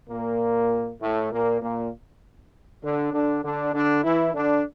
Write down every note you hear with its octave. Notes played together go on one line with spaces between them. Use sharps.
A#2 A#3
A2 A3
A#2 A#3
A#2 A#3
D3 D4
D3 D4
D3 D4
D3 D4
E3 E4
D3 D4